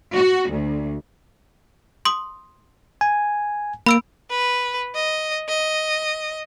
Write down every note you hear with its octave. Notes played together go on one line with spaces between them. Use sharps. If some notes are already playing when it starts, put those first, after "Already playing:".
F#4
D2
C6 D#6
G#5
A#3 B5 E6 D7
B4
D#5
D#5